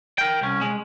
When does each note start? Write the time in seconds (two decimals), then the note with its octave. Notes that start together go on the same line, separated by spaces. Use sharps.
0.18 A#4 G5
0.41 C2 C#4
0.61 G#3